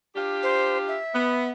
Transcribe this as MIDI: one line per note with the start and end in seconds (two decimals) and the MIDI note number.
0.16 0.97 62
0.16 0.97 65
0.16 0.97 67
0.43 0.78 72
0.88 1.50 76
1.14 1.50 59